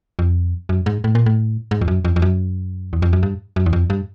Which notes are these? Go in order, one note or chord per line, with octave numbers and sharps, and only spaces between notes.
F2
F#2
G#2
A2
A#2
A2
G#2
F2
F#2
F2
F2
F#2
E2
F2
F#2
G2
F#2
E2
F2
G2